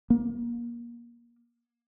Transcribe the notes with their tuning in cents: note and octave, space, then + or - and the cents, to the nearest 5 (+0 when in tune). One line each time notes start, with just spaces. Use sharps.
A#3 +25